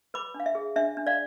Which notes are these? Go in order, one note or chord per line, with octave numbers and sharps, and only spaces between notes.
B4 B5 D6
D4
F5
E5
G#4
D4 E5
D4
D5 F5